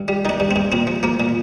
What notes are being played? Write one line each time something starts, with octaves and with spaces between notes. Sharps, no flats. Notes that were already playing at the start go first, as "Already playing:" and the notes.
Already playing: G2
G3
D#3 D4 D#4
G2
C4
G2
A#2 C4
F3
F3 A#3
A#2